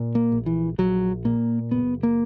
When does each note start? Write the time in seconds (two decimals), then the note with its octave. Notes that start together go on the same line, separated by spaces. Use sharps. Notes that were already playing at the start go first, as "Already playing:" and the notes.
Already playing: A#2
0.15 A#3
0.32 A#1
0.46 E3
0.78 A#1 F#3
1.25 A#2 A#3
1.71 F#1 B3
2.03 A#3